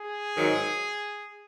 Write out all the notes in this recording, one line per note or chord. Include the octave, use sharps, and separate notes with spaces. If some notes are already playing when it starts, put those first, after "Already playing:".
Already playing: G#4
G#2 D#3 F#3